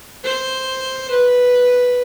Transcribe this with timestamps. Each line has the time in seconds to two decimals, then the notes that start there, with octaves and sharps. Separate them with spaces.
0.24 C5
1.11 B4